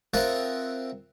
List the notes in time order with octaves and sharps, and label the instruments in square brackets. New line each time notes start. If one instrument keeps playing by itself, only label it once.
[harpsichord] C4 F4 A#4 D#5 E5 F#5